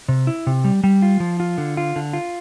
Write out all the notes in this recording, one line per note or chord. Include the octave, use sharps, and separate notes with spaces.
C3
E4
C3
G3
G3
F4
F3
F4
D3
F4
D3
F4